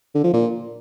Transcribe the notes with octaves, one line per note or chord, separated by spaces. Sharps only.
D3
F3
A#2